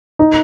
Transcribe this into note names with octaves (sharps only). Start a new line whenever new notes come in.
D#4